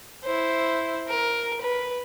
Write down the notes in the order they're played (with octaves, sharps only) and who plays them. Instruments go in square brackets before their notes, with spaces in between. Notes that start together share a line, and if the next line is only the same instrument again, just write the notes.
[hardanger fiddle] E4 C5
A#4
B4